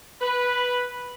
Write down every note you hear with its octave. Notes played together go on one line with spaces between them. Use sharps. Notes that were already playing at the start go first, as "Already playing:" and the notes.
B4